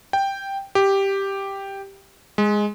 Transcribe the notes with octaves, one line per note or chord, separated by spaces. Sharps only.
G5
G4
G#3